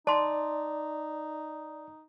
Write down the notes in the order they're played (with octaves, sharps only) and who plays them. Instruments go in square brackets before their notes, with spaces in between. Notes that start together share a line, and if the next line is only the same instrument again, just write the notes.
[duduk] D#4 [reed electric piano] D5 [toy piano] A5 C6